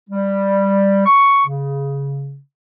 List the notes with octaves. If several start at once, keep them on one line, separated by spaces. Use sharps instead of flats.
G3
C#6
C#3